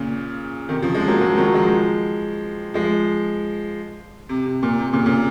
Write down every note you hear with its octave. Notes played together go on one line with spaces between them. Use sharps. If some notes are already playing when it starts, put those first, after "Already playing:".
Already playing: A#2 C#3
C3 D#3
C#3 F3
F3 G#3
F#3 A#3
F3 G#3
D#3 F#3
F3 G#3
F3 G#3
C3
C3
A#2
C3
A#2 C#3
A#2 C#3